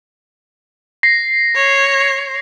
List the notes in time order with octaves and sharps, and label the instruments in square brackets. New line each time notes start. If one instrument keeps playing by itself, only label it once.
[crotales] A#6 C7
[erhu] C#5